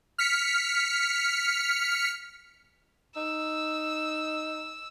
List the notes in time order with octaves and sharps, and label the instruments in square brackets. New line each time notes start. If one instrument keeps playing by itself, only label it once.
[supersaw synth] F6 B6 C#7
[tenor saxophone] D#4 [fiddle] E6